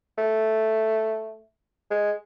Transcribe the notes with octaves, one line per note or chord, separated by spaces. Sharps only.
A3
G#3